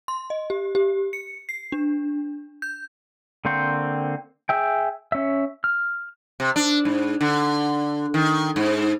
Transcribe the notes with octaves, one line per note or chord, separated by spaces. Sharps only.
C6
D#5
G4
G4
C#7
C7
D4
G6
D3 A#3 C4 C5 C#6
G#4 E5 G5
C#4 E5
F6
C3
D4
G#2
D3
D#3
G#2